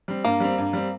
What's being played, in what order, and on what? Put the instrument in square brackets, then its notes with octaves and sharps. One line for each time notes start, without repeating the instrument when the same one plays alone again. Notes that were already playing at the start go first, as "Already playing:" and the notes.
[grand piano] G3 C4
[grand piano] G2 [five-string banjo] A#3
[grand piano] G3 C4
G2
G3 C4